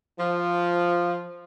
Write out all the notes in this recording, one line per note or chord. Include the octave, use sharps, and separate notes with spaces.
F3